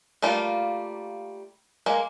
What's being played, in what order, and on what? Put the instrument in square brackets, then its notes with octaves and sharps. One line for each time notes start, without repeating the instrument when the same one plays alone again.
[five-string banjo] G3 A3 A#3 F4
G#3 A#3